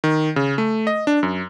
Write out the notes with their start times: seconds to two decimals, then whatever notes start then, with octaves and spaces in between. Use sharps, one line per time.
0.04 D#3
0.36 C#3
0.58 A3
0.87 D#5
1.07 D4
1.23 F#2